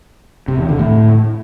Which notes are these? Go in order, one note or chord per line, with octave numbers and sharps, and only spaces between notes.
C3
E2
D3
A2